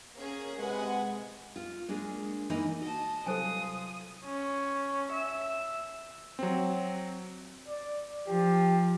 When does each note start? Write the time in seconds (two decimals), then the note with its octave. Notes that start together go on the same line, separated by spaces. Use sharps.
0.15 A#3 C#4 G#4
0.58 C3 G#3 B4 F#5 G#5
1.56 F4
1.88 G#3 A#3 D4
2.50 E3 A#3 D#4
2.81 F#4 D#5 A5
3.26 C3 F#3 G3 F4 A4 C5 G#5 D#6
4.26 C#4
5.12 E5
6.39 F#3 C4
7.68 D5
8.28 F3 G4